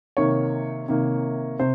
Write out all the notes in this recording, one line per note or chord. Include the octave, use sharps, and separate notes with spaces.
C3 D#3 A#3 C#5
C3 D#3 A#3
C3 C5